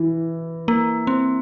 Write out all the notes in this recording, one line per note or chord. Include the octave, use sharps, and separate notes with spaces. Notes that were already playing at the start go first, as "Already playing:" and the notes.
Already playing: E3
A#3
C4